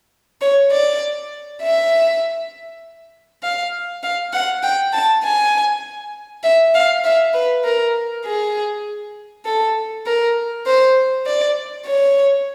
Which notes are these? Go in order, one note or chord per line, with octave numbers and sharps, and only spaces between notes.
C#5
D5
E5
F5
F5
F#5
G5
A5
G#5
E5
F5
E5
B4
A#4
G#4
A4
A#4
C5
D5
C#5